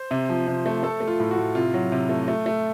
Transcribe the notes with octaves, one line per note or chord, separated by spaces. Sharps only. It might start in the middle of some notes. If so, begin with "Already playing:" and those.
Already playing: C5
C3
F3
C3
A3
A3 A4
A3
F4
A2
F#4
A2
C3 F4
F#3
C3
A3
A3
A3